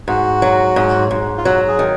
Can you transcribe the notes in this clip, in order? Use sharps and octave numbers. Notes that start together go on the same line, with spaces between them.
G#2 F#4
F#3
G#2
G#2
F4
F#3 F#4
G#4
D#3